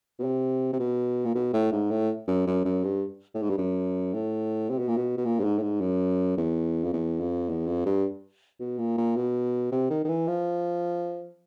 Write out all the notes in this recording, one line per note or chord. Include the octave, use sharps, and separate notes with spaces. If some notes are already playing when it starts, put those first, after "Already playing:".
B2
C3
C3
B2
A#2
B2
A2
G#2
A2
F#2
F#2
F#2
G2
A2
G#2
G2
F#2
A2
C3
B2
A#2
B2
B2
A#2
G2
G#2
A2
G#2
F#2
E2
F2
E2
F2
E2
F2
G2
B2
A#2
A#2
B2
C3
D#3
D#3
E3
F3